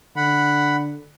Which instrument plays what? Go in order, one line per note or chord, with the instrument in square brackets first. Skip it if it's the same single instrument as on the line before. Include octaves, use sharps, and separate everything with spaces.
[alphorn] D3 [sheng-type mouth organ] F#5 B5